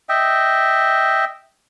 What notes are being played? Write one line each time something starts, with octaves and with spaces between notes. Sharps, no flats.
D#5 E5 G5